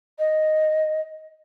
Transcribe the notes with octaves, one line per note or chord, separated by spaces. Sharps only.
D#5